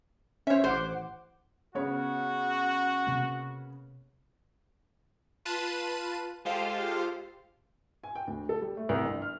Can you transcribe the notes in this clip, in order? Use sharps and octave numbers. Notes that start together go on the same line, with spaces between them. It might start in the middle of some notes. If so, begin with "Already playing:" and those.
C#4 C5 C#5 E5
A1 C5 F#5 D6
C#3 B3 F#4 C#5
C3 A#3
F4 B4 A5 D#7
G#3 F4 G4 A4 C5 F5
G#5
G5
D2
A4
G3
A3
C2
G1
F6